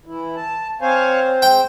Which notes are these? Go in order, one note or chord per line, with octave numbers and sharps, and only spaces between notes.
E3 E4
A5
C4 C5 C#5 F5 G#5
G#3 G5